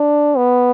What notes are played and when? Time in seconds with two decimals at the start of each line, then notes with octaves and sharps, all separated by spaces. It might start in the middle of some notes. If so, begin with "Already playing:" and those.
Already playing: D4
0.37 B3